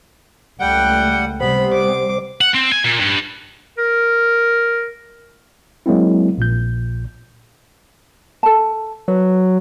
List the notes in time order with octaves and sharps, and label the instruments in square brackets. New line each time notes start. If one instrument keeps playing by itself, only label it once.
[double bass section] C#2 A3 [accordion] G3 F#5 [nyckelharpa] G5
[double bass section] C3 G3 [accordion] B3 [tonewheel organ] C5 [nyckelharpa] B5
[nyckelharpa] D6
[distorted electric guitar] F#5
C4
G#5
A#2
G2
[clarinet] A#4
[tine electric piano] F#3 G#3 A#3 C4 E4
A#1 A#2 G6
[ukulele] A4 A5
[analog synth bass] F#3 [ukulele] B4